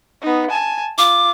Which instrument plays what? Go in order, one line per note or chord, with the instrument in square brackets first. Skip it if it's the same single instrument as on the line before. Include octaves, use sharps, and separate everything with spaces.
[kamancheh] B3 D#4
G#5 A5
[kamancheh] F4 [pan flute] D6